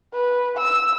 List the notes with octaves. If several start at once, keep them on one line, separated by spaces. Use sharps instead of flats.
B4
E6